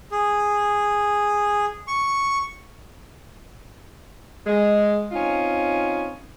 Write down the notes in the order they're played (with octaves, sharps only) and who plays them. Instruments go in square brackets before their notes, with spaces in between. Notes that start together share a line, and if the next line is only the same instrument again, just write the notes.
[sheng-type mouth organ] G#4
C#6
[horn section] G#3
C4 C#4 D#4 F4